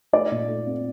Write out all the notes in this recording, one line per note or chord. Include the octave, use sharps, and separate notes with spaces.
A3 D5
A#2
A3
C4